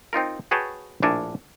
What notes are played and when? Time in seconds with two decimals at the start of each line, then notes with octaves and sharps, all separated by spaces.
0.13 C4 D#4 F4 A#4
0.51 F#4 G#4 B4 C#5 G5 A5
1.02 A#1 A2 D4 A4 A#4 G#5